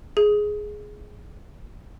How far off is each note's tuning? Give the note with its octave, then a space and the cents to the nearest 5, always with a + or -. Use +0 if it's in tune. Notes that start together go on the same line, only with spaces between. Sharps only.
G#4 +5